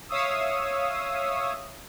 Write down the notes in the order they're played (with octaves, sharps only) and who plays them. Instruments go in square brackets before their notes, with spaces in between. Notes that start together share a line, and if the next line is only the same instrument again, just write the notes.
[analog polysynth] C#5 E5 F5 C#6 D#6 E6